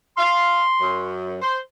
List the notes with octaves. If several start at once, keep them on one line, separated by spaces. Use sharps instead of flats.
F5 C6
F#2
C5